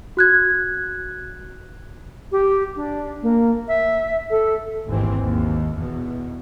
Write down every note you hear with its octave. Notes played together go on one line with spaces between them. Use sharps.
F#4 F#6 G#6
G4
D4
A#3
E5
A4
G#1 D#2 G#2 E3 C4
D#2
E2 B2